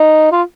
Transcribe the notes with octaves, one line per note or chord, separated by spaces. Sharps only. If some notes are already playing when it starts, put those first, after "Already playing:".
Already playing: D#4
F4